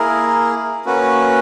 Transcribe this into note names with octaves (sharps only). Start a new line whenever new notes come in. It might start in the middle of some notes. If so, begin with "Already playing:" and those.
Already playing: A#3 E4 G#4 A#4
A#3 C#4 F#4 B4